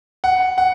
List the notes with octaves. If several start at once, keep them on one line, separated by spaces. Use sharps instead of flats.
F#5
F#5